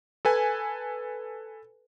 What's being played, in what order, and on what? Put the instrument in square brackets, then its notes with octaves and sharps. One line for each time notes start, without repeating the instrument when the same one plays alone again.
[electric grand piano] A4 B4 G#5